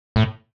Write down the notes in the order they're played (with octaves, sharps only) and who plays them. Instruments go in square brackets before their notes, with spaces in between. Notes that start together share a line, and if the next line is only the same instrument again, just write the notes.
[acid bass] A2